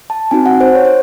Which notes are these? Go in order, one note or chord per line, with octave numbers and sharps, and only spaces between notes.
A5
C4 D#4 F#4 G#5
F#5
C5
C#5
C5